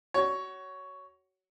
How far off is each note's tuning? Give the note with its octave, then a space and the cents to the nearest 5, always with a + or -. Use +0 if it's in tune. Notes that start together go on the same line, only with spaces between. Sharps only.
F#4 +25 C#5 +10